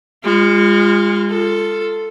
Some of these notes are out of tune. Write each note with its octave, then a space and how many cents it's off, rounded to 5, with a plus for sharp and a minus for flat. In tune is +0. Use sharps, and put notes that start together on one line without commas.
G#3 -35 F4 +0
F4 -5 A4 +5